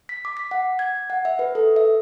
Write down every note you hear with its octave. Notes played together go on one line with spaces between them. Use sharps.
B6
D6
B6
F#5
G#6
F#5
E5
B4
A4
E5